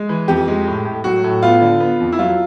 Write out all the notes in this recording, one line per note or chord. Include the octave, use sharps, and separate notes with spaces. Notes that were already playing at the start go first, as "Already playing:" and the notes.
Already playing: G#3
E3
F2 G4
G#3
A2
A2
F#3 F#4
A2
B3 F4
D3
B3
F2
E4
F#3 F4